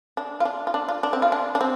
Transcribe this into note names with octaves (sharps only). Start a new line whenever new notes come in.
D4
F4
D4
F4
D4
F4
D4
C4
F4
D4
D4
C4